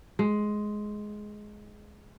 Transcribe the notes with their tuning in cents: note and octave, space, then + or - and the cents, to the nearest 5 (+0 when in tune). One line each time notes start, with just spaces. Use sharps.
G#3 +10